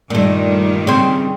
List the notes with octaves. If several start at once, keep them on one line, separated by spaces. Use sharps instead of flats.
G2 A#2 D#3 G3 A3
C#3 C4